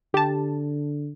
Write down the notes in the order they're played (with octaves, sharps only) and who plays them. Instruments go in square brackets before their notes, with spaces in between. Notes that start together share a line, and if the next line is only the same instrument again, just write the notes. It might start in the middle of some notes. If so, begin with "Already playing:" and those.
[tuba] D3 [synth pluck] G4 A5